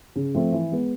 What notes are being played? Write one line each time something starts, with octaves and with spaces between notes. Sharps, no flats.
C#3
F3 A3 C4
E3
G#3 B3